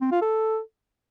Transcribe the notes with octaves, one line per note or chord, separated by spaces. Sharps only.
C4
F4
A4